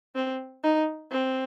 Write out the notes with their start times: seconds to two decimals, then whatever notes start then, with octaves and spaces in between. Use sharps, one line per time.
0.15 C4
0.64 D#4
1.12 C4